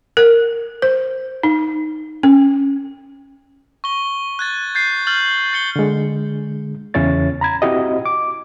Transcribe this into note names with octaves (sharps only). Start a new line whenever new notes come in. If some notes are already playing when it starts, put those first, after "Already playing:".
A#4
C5
D#4
C#4
C#6 G7
F#6 G#6 A6
G6 A6 C7
F6 G6 A6 F#7
A6 C#7 G7
D3 G#3
E2 C#3 C#4 E4 C#5 A6
A#5 B5 G#6
C4 E4 F#4 G4 D#5
D6